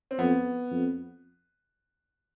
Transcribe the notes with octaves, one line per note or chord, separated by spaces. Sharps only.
C4
F2 B3
F2